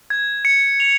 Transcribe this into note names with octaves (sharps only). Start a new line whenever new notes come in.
G#6
C#7
F7